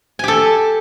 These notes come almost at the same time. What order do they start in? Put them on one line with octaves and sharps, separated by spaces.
G#5 G4 A4